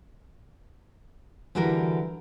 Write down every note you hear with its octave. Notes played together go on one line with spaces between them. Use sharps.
D3 E3 G3 F#4 A#4